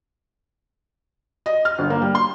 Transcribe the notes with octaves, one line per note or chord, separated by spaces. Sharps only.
D#5
F6
G1
A#3
G3
C6